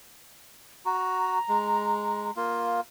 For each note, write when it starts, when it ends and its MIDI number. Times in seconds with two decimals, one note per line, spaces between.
0.86 1.39 66
0.86 2.28 82
1.48 2.31 56
2.36 2.80 58
2.36 2.80 65